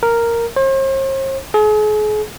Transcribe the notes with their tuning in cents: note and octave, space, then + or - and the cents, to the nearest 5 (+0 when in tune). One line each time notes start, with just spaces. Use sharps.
A#4 -5
C5 +45
G#4 +40